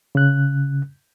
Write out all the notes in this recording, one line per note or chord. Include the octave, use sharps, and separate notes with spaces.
C#3 F#6